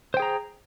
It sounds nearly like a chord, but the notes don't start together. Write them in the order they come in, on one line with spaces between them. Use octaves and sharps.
C5 G5 G#4 A#5